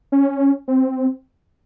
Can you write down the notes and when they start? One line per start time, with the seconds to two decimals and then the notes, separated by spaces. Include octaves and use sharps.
0.12 C#4
0.68 C4